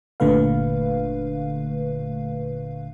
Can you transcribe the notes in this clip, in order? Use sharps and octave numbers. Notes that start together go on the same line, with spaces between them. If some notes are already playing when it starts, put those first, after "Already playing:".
G1 A#2 D3 A3 B4 F5